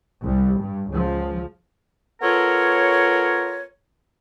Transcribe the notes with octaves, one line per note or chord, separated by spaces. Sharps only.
C2 G3
G2
C#2 F3
B3 F4 A4 A#4 C#5